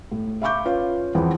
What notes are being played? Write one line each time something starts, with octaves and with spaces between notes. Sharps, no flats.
A2
E5 F5 B5 C#6 D6 G6
C#4 F4 B4 F5
E2 E3 F3 B3 C4